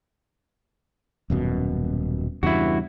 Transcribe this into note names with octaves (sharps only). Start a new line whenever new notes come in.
D#1 F#2 B2
E2 G2 C#3 E4 F#4